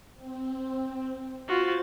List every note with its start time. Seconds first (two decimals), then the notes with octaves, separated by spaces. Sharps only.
0.15 C4
1.48 F4 F#4 C5 A6